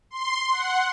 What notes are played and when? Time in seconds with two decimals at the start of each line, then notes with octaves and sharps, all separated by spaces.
0.11 C6
0.52 F#5